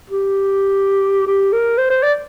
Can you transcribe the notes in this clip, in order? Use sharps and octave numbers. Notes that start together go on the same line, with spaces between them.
G4
G4
A#4
C5
C5
D5